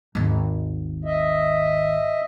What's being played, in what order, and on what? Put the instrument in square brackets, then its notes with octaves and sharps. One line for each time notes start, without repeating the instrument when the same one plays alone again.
[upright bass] G#1 D#2
[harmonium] D#5 E5